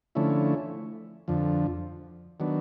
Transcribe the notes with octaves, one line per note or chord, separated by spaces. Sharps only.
D3 F3 A3 C#4 E4
F2 D3 F3
D#3 F#3 B3 D4